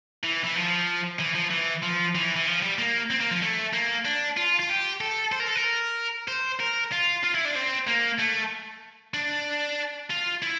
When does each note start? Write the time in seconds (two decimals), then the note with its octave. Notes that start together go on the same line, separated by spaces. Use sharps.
0.23 E3
0.44 E3
0.55 F3
1.19 E3
1.35 F3
1.51 E3
1.83 F3
2.15 E3
2.36 E3
2.46 F3
2.62 G3
2.78 A#3
3.10 C4
3.21 A#3
3.31 F3
3.42 A3
3.74 A#3
4.05 D4
4.37 F4
4.59 F4
4.70 G4
5.01 A4
5.32 C5
5.40 A#4
5.48 A4
5.56 A#4
6.28 C5
6.60 A#4
6.92 F4
7.24 F4
7.35 E4
7.45 D4
7.55 C4
7.88 A#3
8.19 A3
9.14 D4
10.10 F4
10.42 E4